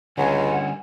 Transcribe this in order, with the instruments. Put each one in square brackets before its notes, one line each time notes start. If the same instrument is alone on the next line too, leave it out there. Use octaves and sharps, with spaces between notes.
[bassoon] C#2 [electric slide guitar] D3 G3 C#4 [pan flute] F#5 [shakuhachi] G#5